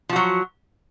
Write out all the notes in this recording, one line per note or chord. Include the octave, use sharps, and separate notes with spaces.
F3 F#3 F#4